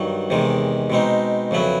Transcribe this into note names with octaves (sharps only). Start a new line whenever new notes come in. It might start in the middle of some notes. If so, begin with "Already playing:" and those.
Already playing: G2 D#3 F#3
E2 C3 D#3 G#3
B2 G#3 C4 D#4
F2 C#3 F#3 B3 E4